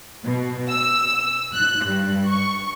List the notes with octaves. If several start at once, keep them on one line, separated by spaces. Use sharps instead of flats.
B2
E6
F#6
G2
C#6